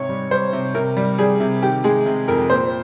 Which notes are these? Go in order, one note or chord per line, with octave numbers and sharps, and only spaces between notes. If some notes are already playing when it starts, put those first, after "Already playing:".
Already playing: G#2 C3 C#5
G3
G3 C5
C3
C3 A#4
G3
G3 G#4
C3
D#3 G4
G#3 G#4
C3
F2 A#4
A#2 C5